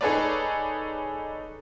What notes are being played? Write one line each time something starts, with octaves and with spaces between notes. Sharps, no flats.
D#4 G#4 A4 B4 C#5 D5